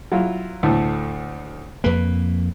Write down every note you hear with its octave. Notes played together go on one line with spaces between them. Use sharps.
F#3 E4 F4
D2 A2 A3
F2 A#3 B4